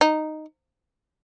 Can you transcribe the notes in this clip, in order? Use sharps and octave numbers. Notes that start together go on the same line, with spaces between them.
D#4